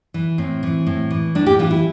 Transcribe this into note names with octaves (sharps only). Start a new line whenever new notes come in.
E3
A2 C4
E3
A2
E3
A2 D4
G4
E3 F4
E4